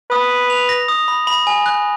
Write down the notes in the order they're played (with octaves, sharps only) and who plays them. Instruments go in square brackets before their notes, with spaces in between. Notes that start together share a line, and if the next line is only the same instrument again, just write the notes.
[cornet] B4 [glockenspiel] D#6
[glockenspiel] B5
F7
A#6
D#6
B5
B5
G#5
F#6